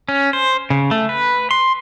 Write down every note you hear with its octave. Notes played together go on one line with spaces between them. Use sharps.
C#4
C5
C#3
A3
B4
C6